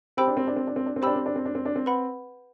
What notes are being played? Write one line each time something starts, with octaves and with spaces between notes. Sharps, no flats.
C4 G4 C5 G5 B5 E6
D4
C4
D4
C4
D4
C4
D4
C4
D4 G4 C5 G5 B5 E6
C4
D4
C4
D4
C4
D4
C4
B4 F#5 B5